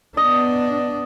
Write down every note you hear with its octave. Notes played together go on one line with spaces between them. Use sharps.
B3 D4 D#5